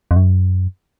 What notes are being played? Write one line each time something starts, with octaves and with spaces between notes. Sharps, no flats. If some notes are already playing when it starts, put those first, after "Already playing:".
F2
F#2